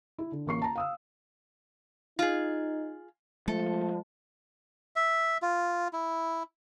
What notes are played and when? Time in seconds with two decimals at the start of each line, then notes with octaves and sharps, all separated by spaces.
0.18 E4
0.32 D3
0.46 A1 A#3 C#6 C7
0.62 A5 A#5
0.75 F5 D#6 E6
2.19 D#4 F4 G#4
3.48 F3 G#3 A3 A4
4.96 E5
5.42 F4
5.93 E4